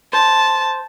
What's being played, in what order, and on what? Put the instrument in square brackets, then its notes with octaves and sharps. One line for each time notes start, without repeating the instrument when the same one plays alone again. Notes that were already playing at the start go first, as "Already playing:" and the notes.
[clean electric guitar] C5 [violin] A5